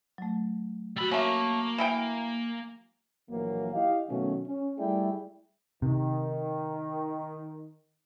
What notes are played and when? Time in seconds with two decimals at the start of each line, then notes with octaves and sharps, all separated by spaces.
0.18 F#3 A3
0.97 G3 F#4 B5 E6
1.11 A3 A#3 C#4 A5
1.78 E3 E4 G5
3.29 A#1 E3 F#3 A#3
3.74 E4 G4 D#5 F5
4.09 B2 D#3 F#3 A3 C#4
4.46 C#4
4.78 G3 A3 E4 G#4 D5 G5
5.82 C3 D#3